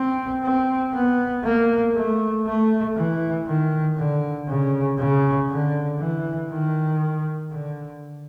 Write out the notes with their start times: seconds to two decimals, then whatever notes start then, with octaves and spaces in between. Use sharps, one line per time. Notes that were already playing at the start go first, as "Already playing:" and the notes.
Already playing: C4
0.43 C4
0.94 B3
1.44 A#3
1.95 A3
2.46 A3
2.96 E3
3.47 D#3
3.97 D3
4.48 C#3
4.98 C#3
5.50 D3
5.99 E3
6.51 D#3
7.52 D3